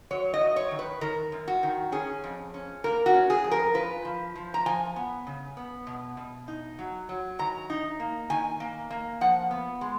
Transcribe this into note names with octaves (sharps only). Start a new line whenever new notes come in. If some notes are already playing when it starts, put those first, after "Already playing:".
F#3 C#5
D#5
F#3
C#5
D#3
B4
D#3 A#4
F#2
F#4
D#3
C#4 G#4
F2
C#4
A#3 A#4
F#4
C#4
G#4
F2
A#4
F4 B4
F3
F3
A#5
F3 G#5
B3
C#3
B3
B2
B2
D#4
F#3
F#3
D#3 A#5
D#4
A#3
D#3 G#5
A#3
A#3
F3 F#5
B3
G#3